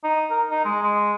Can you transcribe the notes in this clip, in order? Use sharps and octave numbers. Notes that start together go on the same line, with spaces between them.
D#4
A#4
D#4
G#3
G#3